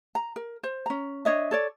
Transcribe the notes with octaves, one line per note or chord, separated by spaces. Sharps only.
A#5
A#4
C5
C#4 A#5
D4 C#5 D#5 E5
A4 C#5 D5